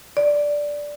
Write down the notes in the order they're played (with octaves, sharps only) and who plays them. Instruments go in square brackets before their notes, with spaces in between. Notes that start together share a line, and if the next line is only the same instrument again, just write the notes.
[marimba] D5